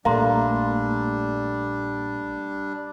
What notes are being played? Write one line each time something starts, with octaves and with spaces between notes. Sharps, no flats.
A#1 G3 A3 A#3 D4 F5 A#5 C6